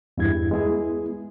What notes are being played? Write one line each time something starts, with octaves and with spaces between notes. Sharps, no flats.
E2 G2 E4 G#6
G#3 B3 E4 G#4